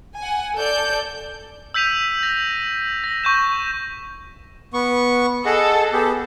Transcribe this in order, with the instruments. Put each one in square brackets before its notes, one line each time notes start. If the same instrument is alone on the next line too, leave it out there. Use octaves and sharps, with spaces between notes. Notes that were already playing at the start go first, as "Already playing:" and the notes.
[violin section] F#5 G#5
A4 D5 G6
[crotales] E6 G6 B6 D#7 F7
A#6
A#6
C#6 G6 E7
[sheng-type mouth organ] B3 C#6
[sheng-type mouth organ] G#4 D#5 F#5 [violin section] A4
[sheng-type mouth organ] B3 G4 G#4